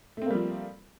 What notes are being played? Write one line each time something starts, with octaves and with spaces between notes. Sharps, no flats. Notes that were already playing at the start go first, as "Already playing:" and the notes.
F3 G3 A3 A#3 C4